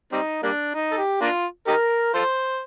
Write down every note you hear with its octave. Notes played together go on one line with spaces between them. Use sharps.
G3 C4 D#4
G3 A#3 D4
D#4
A4
G4
A#3 D4 F4
D#4 G4 A#4
F4 A4 C5